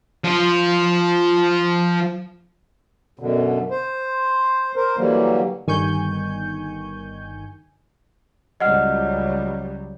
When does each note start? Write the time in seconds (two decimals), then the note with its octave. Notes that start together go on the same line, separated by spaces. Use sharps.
0.24 F3 F4
3.19 F#2 B2 D3
3.71 C5
4.76 A#4 C5
4.98 D3 E3 F#3 G3 A#3
5.67 G1 D#3 G#5 C#6 G6
8.60 C#2 F#3 G3 D#5 F#5 F6